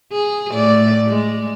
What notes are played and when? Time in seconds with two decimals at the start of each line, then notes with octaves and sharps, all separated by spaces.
0.13 G#4
0.52 A2 D5
1.07 G#3